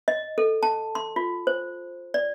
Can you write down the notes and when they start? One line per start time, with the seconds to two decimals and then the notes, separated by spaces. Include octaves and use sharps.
0.08 D#5
0.38 A4
0.63 A5
0.95 C6
1.16 F4
1.47 C5
2.14 D5